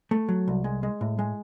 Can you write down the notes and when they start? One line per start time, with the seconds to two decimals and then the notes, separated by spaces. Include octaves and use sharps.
0.11 A3
0.29 F#3
0.48 C2
0.64 G#3
0.83 G#3
1.01 A2
1.19 G#3